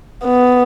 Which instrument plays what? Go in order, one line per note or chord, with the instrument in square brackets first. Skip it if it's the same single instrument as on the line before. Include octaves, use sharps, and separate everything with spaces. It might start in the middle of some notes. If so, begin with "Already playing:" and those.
[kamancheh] B3